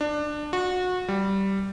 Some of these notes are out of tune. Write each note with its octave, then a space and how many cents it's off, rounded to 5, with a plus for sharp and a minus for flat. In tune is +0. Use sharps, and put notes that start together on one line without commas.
D4 +20
F#4 -25
G3 -10